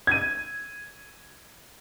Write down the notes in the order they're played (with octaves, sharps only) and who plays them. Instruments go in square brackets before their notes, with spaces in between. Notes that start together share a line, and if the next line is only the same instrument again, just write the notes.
[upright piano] G#6 D#7